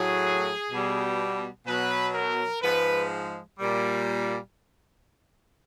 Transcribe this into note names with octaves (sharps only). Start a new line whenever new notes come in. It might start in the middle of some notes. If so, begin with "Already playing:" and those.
Already playing: A2 F#3 G#4
B2 G3
B2 F#3 B4
A#4
G#2 F3 G#3 B4
A#2 G3